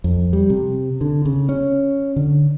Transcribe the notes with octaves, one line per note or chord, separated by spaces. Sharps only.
F2
G3
C3
D3
C#3
C#4
D3